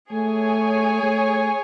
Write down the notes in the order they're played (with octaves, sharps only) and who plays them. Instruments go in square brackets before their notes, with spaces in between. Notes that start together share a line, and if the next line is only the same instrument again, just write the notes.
[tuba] A3 [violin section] G#4 C#5 G#5
[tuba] A3